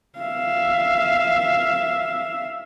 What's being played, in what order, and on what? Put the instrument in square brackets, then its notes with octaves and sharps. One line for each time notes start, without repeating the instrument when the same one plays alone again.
[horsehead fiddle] E5 F5